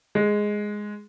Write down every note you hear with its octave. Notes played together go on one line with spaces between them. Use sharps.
G#3